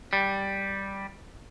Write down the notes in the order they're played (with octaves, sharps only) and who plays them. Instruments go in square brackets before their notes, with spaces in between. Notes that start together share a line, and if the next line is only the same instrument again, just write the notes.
[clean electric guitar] G3